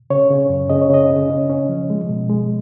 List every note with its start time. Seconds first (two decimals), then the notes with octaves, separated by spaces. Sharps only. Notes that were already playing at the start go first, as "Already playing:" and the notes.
0.10 C#3 C#5
0.31 C#3
0.49 F#2
0.70 C#3 D#5
0.81 C#5
0.90 C#3 D#5
1.10 C#3
1.30 C#4
1.50 C#4
1.69 F3
1.90 G#3
2.09 B2
2.29 G#3